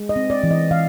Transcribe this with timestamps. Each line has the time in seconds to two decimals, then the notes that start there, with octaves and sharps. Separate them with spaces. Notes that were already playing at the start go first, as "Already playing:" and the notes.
Already playing: G#3
0.09 D#5
0.16 C4
0.30 D5
0.43 E3
0.51 D#5
0.71 E3 F5